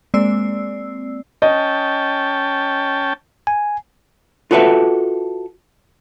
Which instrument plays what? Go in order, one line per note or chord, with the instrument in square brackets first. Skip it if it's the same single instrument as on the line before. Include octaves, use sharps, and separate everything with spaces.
[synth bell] G#3 A#3 C4 D5 E6 C7
[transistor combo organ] C#4 G5 A5 [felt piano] D#5
[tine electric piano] G#5
[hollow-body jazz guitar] F4 F#4 A4 B4 E5 F#5